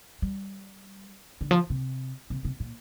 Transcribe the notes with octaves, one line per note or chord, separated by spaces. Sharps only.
G3
D3
F3
C3
C3
C3
A#2